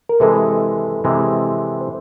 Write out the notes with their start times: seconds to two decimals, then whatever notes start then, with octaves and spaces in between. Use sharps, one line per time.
0.09 A#4
0.20 C3 E3 G#3 A4 B4
1.04 C3 E3 G#3
1.81 C5